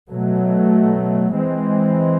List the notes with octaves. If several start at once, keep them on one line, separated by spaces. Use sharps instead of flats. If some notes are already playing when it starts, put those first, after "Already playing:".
B2 F#3 A3
E3 G#3 C4